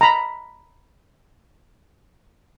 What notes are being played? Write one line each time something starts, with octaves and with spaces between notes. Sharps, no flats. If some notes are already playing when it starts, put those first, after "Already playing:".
A#5 B5